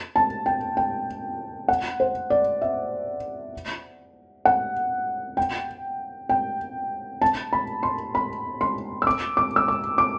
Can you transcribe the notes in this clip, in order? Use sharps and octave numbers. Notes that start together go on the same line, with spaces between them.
A5
G5
G5
F#5
C5
D5
E5
F#5
G5
G5
A5
B5
C6
B5
C6
E6
D6
D6
E6
D6
D6